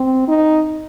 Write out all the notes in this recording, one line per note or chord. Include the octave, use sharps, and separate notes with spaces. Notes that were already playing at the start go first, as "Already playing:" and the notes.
Already playing: C4
D#4